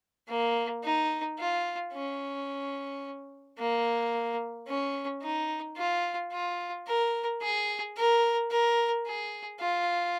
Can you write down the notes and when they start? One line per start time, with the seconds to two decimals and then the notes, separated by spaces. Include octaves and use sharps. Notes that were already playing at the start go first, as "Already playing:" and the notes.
0.28 A#3
0.83 D#4
1.38 F4
1.93 C#4
3.58 A#3
4.67 C#4
5.22 D#4
5.77 F4
6.32 F4
6.86 A#4
7.42 G#4
7.96 A#4
8.51 A#4
9.06 G#4
9.60 F4